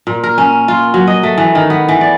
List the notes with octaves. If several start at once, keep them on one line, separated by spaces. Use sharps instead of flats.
A#2
A#4
C#4
F4
F#3
D#5
A3
E3
D#3
B3
E3
D5